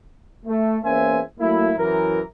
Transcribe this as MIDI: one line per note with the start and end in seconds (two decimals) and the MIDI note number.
0.46 0.77 57
0.84 1.20 40
0.84 1.20 58
0.84 1.20 61
0.84 1.20 72
0.84 1.20 76
0.84 1.20 80
1.39 1.71 54
1.39 1.71 57
1.39 1.71 58
1.39 1.71 64
1.78 2.20 42
1.78 2.20 52
1.78 2.20 70